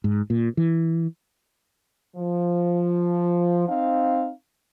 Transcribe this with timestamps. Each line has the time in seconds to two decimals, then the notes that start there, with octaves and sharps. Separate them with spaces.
0.04 G#2
0.30 A#2
0.57 E3
2.17 F3
3.69 C4 D#4 F5